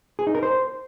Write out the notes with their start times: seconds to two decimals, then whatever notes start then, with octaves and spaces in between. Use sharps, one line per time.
0.19 G#4
0.27 D#4
0.35 A#4
0.43 C5